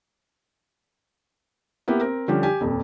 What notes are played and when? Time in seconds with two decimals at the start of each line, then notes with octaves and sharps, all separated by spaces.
1.88 A#3 B3 E4 G4
2.01 C4 A#4
2.28 D3 F3 G3 C#4 G4
2.43 G4 G#5
2.61 D#1 F2